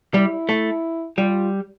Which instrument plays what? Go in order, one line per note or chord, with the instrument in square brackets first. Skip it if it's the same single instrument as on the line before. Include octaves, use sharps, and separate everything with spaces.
[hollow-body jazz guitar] G3 [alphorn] E4
[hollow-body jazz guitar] A3
[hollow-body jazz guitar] G3 [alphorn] F4